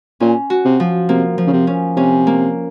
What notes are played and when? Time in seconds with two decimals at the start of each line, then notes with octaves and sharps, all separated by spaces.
0.20 A#2 C#4
0.50 F#4
0.65 C3
0.80 F3
1.09 C3 A#3
1.38 F3
1.47 C#3
1.53 C3
1.67 C#4
1.96 C3 C#4
2.27 A#3